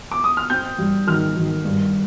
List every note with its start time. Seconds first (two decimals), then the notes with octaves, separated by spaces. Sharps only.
0.12 D6
0.24 D#6
0.37 F6
0.50 C4 G6
0.78 G3
1.07 D#3 F6
1.36 D#3
1.65 G2